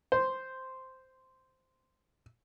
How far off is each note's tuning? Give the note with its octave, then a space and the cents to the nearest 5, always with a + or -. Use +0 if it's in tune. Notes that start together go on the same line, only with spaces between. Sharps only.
C5 -5